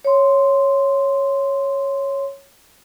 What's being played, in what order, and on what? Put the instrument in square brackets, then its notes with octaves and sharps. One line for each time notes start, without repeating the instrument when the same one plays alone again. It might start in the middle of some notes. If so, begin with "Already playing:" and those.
[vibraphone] C#5 C6